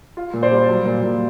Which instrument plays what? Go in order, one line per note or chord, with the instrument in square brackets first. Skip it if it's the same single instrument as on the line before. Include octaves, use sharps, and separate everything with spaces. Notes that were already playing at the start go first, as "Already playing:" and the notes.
[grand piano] F4
A#2
C5 D5
G3
F#3
A#2
A#2